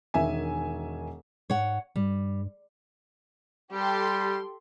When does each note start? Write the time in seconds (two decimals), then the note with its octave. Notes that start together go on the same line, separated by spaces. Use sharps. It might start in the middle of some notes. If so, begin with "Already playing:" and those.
0.14 E1 D#3 E5 G#5
1.50 G#2 C#5 F#5
1.96 G2 G3
3.73 G3 G4 A4 C6